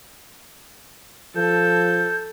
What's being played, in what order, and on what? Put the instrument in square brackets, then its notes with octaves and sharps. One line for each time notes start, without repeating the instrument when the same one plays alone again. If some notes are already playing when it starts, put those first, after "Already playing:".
[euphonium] F3 [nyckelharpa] A4 [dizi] G6